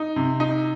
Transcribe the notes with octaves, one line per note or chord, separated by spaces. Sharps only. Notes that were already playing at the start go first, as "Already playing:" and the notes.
Already playing: D#4
C3
D#4